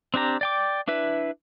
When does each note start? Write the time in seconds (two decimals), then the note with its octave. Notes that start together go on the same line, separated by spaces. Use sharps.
0.14 C4 D4 G4 A#5
0.41 D5 G5 D6
0.88 D4 E4 B4 E5